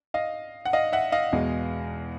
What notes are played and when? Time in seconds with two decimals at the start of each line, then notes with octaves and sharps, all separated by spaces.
0.14 D#5 F5
0.65 F#5
0.73 D#5 F5
0.93 E5 F#5
1.12 D#5 F5
1.33 E2 B2 G#3